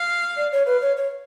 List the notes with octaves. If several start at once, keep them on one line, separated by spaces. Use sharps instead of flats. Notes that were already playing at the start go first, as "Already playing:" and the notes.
Already playing: F5
D5
C#5
B4 F5
C#5
C#5